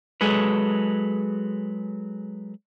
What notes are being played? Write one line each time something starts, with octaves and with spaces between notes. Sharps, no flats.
F#3 G#3 G#4 A4 B4